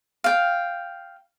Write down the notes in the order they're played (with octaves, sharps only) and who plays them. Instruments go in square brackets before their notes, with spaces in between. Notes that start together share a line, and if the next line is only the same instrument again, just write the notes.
[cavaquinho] F5 G5